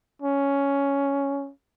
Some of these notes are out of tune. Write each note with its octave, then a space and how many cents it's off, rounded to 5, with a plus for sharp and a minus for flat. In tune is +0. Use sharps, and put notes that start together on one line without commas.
C#4 +5